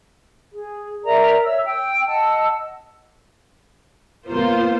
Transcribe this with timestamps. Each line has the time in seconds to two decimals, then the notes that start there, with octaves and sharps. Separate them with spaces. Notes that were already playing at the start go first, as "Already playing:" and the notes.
0.53 G#4
1.04 A#4 D5 E5 A#5
1.44 C#5 E5 E6
1.66 G5 E6
2.06 D#5 F#5 A5 E6
4.28 A#3 B3 F4 C5